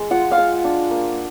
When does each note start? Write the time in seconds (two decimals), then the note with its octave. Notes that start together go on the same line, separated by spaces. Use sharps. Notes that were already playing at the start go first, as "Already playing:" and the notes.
Already playing: G#3
0.11 F4 F#5
0.31 F5
0.38 G#3 F#5
0.64 D4
0.90 A#3